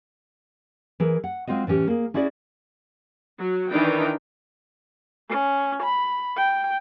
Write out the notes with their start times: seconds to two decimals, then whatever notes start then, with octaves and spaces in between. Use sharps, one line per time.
1.00 E3 G#4 A#4
1.24 F#5
1.47 G#3 C4 F4 F#4 D#5
1.67 A2 E3 C#4 G4
1.88 A#3 G#4
2.14 C#4 E4 F#4 G#4 D5
3.38 F#3
3.71 D#3 E3 D4 D#4 G5
5.29 C#4
5.83 B5
6.37 G5